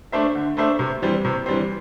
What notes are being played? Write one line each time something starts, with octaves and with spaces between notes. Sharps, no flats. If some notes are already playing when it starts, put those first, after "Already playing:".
A3 D4 C5 E5
D3
A3 D4 C5 E5
C3
E3 G3 C4
C3
E3 G3 C4